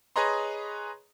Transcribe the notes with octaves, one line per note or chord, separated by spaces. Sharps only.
G#4 B4 C#5 D#5 A#5 C6